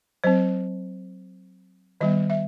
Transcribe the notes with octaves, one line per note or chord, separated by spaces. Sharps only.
F#3 C4 C5
D#3 G3 B3 D#5
E5